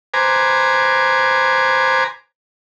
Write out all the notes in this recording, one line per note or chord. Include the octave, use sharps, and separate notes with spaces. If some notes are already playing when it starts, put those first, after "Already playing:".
B4 C5 G#5 A#5 D6